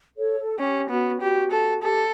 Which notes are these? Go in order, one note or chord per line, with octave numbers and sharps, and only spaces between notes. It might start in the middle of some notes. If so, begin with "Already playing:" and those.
A4 C#5
A4
C#4 G4
B3 F#4
F#4 G4
A4
G4 A4